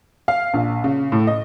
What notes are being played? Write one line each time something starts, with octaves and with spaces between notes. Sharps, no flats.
F5
A#1
C#3
A2
D#5